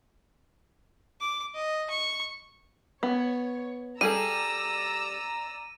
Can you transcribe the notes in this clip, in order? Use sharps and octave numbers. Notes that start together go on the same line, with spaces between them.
D6
D#5
C#6
B3 C#5
G3 G#4 A4 D5 A#5 E6 D#7